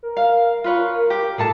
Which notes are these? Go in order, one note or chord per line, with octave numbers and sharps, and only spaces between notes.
A#4
F5
F4 B4 C#5
G4
A2 G#4 A4 A5